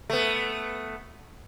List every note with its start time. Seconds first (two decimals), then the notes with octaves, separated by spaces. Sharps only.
0.10 A3 B3